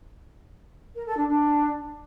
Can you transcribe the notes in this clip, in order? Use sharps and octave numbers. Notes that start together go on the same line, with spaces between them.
A#4
A4
D4
D4